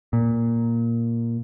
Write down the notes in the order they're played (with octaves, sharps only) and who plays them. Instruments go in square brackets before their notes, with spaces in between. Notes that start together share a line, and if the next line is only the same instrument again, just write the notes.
[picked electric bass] A#2